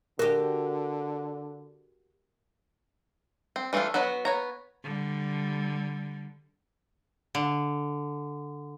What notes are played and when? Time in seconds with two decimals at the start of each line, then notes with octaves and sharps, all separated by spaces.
0.19 D3 F#4 G4 A#4
3.56 C4
3.73 E3 A3 C4 D4 F4
3.94 F#3 B3 B4 D#5
4.25 B3 C#5 A#5
4.83 D3 G3
7.35 D3